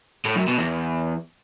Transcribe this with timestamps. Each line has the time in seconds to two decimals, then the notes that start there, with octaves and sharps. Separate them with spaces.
0.25 A2
0.36 F#2
0.47 B2
0.58 E2